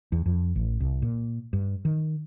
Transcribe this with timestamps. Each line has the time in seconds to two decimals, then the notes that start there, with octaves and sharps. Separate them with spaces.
0.12 E2
0.26 F2
0.56 A1
0.80 C2
1.02 A#2
1.53 G2
1.85 D#3